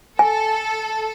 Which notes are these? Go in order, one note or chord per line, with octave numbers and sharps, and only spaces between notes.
A4 G#5